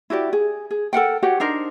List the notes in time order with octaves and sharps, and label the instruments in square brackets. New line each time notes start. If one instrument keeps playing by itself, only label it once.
[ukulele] E4 F#4 G4 D5
G#4
G#4
A4 A#4 F#5 G5
F#4 G4 C#5 F#5
D4 D#4 A#4 C5